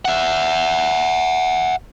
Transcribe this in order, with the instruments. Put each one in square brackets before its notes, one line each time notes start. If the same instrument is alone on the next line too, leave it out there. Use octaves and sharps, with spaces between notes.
[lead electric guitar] E5 F#5